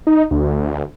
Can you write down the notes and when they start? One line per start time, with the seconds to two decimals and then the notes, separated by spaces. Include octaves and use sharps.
0.07 D#4
0.31 D2